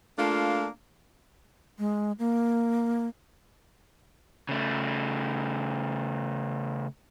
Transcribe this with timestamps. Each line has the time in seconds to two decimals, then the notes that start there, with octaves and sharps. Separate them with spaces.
0.18 A3 A#3 D4 F4
1.79 G#3
2.19 A#3
4.49 C#3 A3